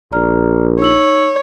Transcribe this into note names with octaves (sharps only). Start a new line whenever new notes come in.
A#1 D5 A#5 F6
D#4 C#5 E6 F#7